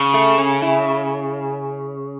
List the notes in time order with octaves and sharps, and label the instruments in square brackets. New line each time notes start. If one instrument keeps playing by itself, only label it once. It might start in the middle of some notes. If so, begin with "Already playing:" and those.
Already playing: [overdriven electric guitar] C#3
[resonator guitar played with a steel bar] A3
C#4
E4